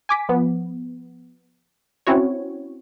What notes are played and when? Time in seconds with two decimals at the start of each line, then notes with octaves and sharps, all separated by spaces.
0.09 G#5 D6 B6
0.29 F3 B3
2.07 C4 C#4 E4 F#4 C#5